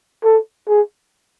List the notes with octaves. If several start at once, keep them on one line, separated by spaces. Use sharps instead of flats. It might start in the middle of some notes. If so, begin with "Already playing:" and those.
A4
G#4